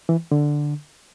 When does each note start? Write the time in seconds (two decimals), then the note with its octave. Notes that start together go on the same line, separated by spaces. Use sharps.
0.09 E3
0.32 D3